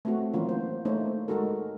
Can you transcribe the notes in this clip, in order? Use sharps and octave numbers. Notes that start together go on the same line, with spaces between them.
A3 C4 F#4
E3 F#3 A3 A#3 C#4 F4
C5
A3 A#3 D#4 C5 C#5
G#3 D#4 F#4 A4 A#4